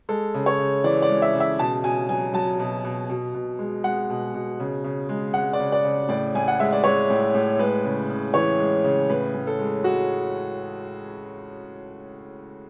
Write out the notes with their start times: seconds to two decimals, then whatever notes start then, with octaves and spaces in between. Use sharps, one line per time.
0.09 G#3 A4
0.34 C#3
0.46 C#5
0.59 C#3
0.84 E3 D5
1.02 D5
1.09 G#3
1.22 E5
1.34 C#3
1.40 E5
1.59 B2 A5
1.84 B2 G#5
2.09 F#3 G#5
2.34 F#3 A5
2.59 B2
2.85 B2
3.10 B2
3.34 B2
3.59 G#3
3.84 G#3 F#5
4.10 B2
4.34 B2
4.60 C#3
4.84 C#3
5.09 G#3
5.34 G#3 F#5
5.53 D5
5.59 C#3
5.72 D5
5.84 C#3
6.09 A2 D5
6.35 A2 G#5
6.48 F#5
6.59 G#3 E5
6.73 D5
6.84 G#3 C#5
7.10 A2
7.34 A2
7.59 G#3 B4
7.84 C#3
8.09 C#3
8.34 E3 C#5
8.59 G#3
8.84 C#3
9.09 A2 B4
9.34 A2
9.47 A4
9.59 G#3
9.84 G#3 F#4